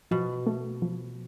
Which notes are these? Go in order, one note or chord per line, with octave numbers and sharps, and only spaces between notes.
B2 F3
A3
F3